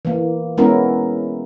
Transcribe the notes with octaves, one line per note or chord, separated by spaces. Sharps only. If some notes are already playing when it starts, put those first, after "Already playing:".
E3 A#3
G#3 B3 C#4 E4 A#4